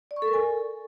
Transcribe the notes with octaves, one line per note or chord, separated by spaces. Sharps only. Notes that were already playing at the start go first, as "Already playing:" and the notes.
D5
C#6
A4
A#4
G#5